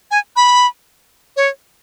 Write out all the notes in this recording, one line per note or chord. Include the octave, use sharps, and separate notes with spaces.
G#5
B5
C#5